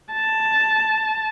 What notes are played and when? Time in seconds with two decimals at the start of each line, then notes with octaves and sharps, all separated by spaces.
0.13 A5